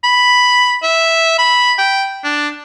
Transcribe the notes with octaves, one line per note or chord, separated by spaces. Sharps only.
B5
E5
B5
G5
D4